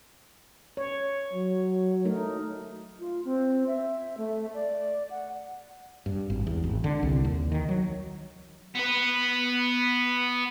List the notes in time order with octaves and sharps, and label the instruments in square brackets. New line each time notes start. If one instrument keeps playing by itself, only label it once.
[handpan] C#5
[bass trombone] F#3
[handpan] A3 D#4 A#4
[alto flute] F4
C4
E5
A3
D5
F#5
[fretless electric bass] G2
G#1
E2
G#1
D3
C2
D#2
D#3
F#3
[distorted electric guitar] B3 B4